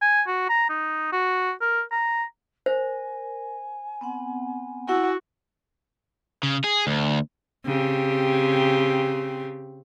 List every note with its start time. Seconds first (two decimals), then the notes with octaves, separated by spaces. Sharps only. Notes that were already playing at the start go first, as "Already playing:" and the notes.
0.02 G#5
0.27 F#4
0.49 A#5
0.69 D#4
1.12 F#4
1.61 A#4
1.92 A#5
2.66 A#4 C5 G#5
4.01 B3 C4 F#5
4.89 E4 F#4 F#5 E6
6.43 C#3
6.64 G#4
6.87 D2
7.66 C#3 C4 G4